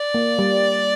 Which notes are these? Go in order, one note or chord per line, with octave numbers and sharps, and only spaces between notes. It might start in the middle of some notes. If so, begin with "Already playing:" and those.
Already playing: D5
A#3
G3